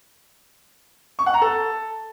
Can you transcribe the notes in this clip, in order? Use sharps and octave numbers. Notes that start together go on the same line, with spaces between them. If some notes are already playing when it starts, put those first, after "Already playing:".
C#6
F#5
A#5
A4